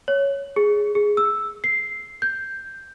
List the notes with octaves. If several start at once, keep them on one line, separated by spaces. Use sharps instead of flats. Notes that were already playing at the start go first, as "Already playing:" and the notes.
C#5
G#4
G#4
E6
C7
G6